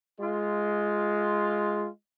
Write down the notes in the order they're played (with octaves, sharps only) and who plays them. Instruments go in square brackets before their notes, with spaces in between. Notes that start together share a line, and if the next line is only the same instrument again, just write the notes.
[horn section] G#3 F4